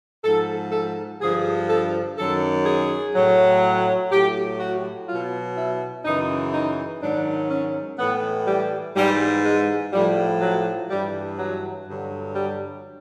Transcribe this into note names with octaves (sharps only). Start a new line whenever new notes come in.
G#2 F3 A4
A4
G2 D3 F3 G#4
A4
F#2 D#3 F#3 A4
G#4
A2 F#3
A2 F#3 G4
F#4
B2 F#3 F4
E4
F#2 C#3 E3 D#4
D#4
G#2 D#3 F#3 D4
C#4
A2 E3 B3
G3
G#2 E3 G3
G#3
A2 F3 G3
F#3
G2 E3 G3
F#3
G2 D3 F#3
G3